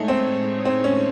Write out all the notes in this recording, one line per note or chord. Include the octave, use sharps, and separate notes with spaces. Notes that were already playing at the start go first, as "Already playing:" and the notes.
Already playing: A2 G#3 A3 D#4 G#4 C#5
C4
C4
C#4